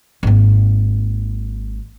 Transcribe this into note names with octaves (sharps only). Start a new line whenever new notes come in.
G#1 A#3